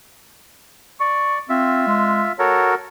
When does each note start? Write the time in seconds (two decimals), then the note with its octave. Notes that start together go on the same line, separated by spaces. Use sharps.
1.00 D5 C#6
1.49 C4 F4 E5
1.87 G#3
2.39 F#4 A4 A#4 C#5